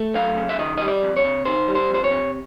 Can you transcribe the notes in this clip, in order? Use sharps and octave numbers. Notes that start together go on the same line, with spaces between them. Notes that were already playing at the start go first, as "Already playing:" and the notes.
Already playing: A3
F#2 F5
C#3
E5
D#3 D#5
G3 D#5
D5
F2
C#5
C3
D#3 C5
G3
C5
F2 C5
C#5
C3